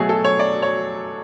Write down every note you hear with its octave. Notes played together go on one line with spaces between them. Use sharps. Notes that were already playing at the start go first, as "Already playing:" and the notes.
Already playing: B2 F#3 A3 G#4
A4
C#5
D5
C#5